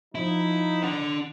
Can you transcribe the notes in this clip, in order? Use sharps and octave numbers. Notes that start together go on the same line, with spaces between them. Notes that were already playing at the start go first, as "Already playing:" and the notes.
F3 D#4 E4
D4 F#5